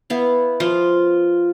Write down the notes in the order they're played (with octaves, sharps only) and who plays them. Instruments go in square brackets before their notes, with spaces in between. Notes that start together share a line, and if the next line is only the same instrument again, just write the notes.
[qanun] B3 E4 F5
[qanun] F3 [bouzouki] F4